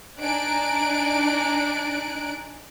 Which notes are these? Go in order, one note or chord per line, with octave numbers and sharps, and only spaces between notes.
D4 D#4 G#5 F#6 D7